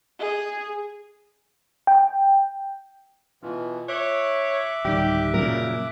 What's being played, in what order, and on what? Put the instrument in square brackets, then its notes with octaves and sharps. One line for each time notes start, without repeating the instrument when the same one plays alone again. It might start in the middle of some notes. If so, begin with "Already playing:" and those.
[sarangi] G#4
[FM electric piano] G5
[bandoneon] B2 E3 [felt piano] F4
[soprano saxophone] C#5 [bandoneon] E5 D6 F#6
[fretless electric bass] D1 [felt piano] D#3 G3 [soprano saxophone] G4
[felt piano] F#2 [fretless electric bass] A#2 C#3 [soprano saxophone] A#4